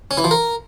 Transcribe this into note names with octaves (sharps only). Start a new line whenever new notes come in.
C#4
E3
F3
A#4